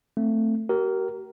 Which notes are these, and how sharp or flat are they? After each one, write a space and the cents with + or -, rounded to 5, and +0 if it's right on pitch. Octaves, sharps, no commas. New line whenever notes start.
A3 +20 C4 +5
G4 -45 A#4 +0